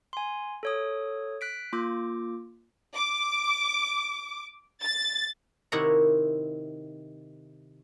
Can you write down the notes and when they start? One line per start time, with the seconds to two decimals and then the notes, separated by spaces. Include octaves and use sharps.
0.13 G#5 C6
0.63 A4 C#5 D#6
1.41 F#6 B6 D7
1.73 A#3 F4 D6
2.96 D6
4.82 A6
5.72 C3 D#3 E4 C#5 F#5 A#5